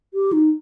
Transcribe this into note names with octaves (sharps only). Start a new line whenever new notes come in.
G4
D#4